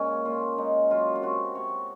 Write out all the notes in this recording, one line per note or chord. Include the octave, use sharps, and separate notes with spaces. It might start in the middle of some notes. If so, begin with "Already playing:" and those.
Already playing: A#2 G#3 C#4
A#2 F4
G#3 D#4
F#3 F4
F4
C3 F#4
C3 C#5